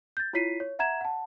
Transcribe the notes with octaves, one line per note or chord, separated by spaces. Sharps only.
G6 A6
E4 F4 C#5 B6 C7 D#7
C#5
E5 F#5 A#5 G#6 E7
F#5 A5